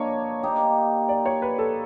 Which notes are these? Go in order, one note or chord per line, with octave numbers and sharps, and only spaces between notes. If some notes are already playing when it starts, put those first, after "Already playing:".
Already playing: A#3 D4 C#5 D#5
A#3 D#4 G4
D5
C#5
B4
A4